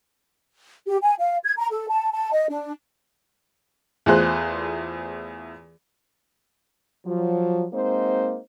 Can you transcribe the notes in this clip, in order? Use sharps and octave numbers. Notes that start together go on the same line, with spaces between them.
G4
G#5
F5
G#6
A#5
A4
A5
A5
D#5
D4
E2 A3 F4 G#4 C5 F#6
F3 F#3
G#3 A#3 C4 D#4 C5